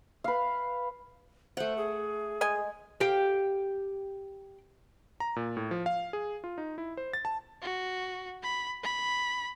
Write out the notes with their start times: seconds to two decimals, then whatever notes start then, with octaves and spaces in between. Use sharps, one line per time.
0.24 B4 F5
1.57 A3 C5 F#5
1.77 G#4
2.41 G#3 D#5 G#5
3.00 G4 F5
5.20 A#5
5.36 A#2
5.57 A2
5.71 F3
5.86 F5
6.13 G#4
6.44 F4
6.58 D#4
6.78 E4
6.97 C5
7.13 A6
7.25 A5
7.62 F#4
8.43 B5
8.83 B5